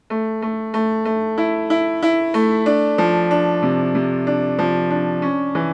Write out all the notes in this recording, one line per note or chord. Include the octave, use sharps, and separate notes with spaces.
A3
A3
A3
A3
E4
E4
E4
A3
D4
F3
D4
C3
C3
D4
F3
D4
C#4
E3